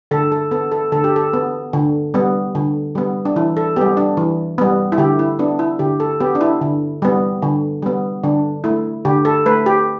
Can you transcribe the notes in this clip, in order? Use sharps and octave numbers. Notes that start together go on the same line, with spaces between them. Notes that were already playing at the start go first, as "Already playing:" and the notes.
D3 A4
A4
B3 A4
A4
D3 A4
G4
A4
B3
D3
G3 B3
D3
G3 B3
D4
E3 E4
A4
G3 B3 G4
D4
E3
G3 B3
E4
D3 G4
E4
B3 D4
E4
D3 G4
A4
B3 G4
D4
E4
D3
G3 B3
D3
G3 B3
D3 D4
A3 E4
D3 G4
A4
A3 B4
G4